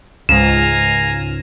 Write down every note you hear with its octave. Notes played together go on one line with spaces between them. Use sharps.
C#2 G#2 F5 G#5 A#5 E7